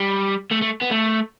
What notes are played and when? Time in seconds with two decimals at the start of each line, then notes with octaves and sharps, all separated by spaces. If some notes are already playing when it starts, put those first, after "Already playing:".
Already playing: G3
0.51 A3
0.62 A3
0.82 B3
0.91 A3